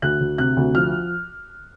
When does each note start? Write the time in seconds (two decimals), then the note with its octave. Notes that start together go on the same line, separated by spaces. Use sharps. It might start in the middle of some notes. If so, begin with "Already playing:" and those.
0.02 D2 F#6
0.20 D2
0.38 C3 F#6
0.57 D2
0.75 F3 F6